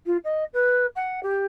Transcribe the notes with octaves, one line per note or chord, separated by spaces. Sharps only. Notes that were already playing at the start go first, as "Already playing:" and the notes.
F4
D#5
B4
F#5
G4